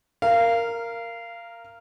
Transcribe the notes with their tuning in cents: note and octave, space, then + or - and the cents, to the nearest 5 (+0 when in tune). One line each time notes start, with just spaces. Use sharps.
A#4 -5 F5 -20